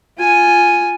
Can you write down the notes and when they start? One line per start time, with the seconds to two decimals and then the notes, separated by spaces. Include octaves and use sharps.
0.18 F4 G#5